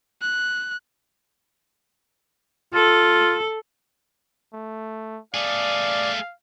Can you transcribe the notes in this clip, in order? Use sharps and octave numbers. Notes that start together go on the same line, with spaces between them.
F#6
F4 A4
A3
A3 G#4 D5 F5